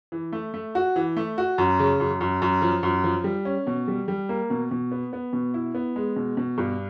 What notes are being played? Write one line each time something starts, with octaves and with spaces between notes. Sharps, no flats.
E3
A3
A3
F#4
E3
A3
F#4
F#2
C#3
F#2
F#2
F#2
F3
F#2
F3
G3
C#4
B2
G3
G3
A#3
B2
B2
B3
B3
B2
E4
B3
G#3
B2
B2
G2